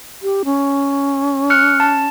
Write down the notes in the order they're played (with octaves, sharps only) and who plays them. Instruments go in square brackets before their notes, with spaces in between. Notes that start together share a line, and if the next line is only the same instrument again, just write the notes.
[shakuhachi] G4
C#4
[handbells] F6 F#6 C#7
A5